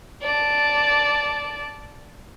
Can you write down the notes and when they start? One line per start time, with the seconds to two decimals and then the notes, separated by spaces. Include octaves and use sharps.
0.22 D5 A5